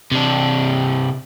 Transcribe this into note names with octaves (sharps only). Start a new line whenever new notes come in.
C3 D4